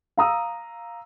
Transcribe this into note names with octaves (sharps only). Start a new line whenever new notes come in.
F5 A#5 D#6 E6